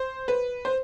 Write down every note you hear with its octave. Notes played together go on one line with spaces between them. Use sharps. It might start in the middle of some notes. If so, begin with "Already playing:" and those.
Already playing: C5
B4
C5